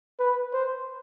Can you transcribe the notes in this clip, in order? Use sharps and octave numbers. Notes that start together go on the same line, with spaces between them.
B4
C5